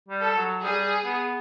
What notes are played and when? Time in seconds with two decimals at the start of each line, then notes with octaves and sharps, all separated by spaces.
0.09 G3
0.22 A4
0.36 F#3
0.63 G3 G#4
1.05 B3